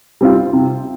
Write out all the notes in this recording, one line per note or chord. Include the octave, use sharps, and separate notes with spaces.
G3 C4 F4
C3